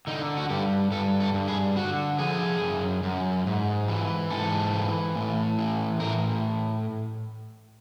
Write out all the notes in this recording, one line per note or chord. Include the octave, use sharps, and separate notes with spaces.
D3 D#4
F#4
G2 G4
G2 A4
A4
G2
G#4
D3 F#4
F3 G#4
F#2
F#2
G#2
E3
G#2 A4
E3
A2
E3
A2 A#4